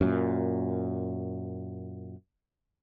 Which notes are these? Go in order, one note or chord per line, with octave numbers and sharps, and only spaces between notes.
F#2 A#2